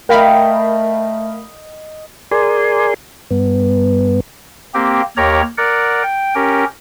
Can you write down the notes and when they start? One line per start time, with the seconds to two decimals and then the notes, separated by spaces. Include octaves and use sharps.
0.09 A3 A#4 D#5 F5 G5 B5
2.31 G#4 A#4 D5 G#5 C6
3.31 G2 B3
4.74 A#3 C4 G4
5.17 D#2 G4 A#4 C#5 A#5
5.58 A#4 D5 F#5
6.03 G5
6.35 C#4 G4 A#4